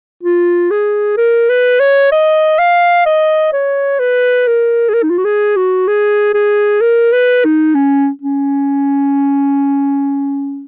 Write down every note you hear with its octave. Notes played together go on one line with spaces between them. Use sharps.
F4
G#4
A#4
B4
C#5
D#5
F5
D#5
C#5
B4
A#4
G#4
A#4
D#4
F4
F#4
G#4
F#4
G#4
G#4
A#4
B4
D#4
C#4
C#4